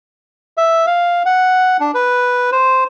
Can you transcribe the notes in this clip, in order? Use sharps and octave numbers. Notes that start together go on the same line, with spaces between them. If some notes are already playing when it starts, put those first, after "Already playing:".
E5
F5
F#5
D4
B4
C5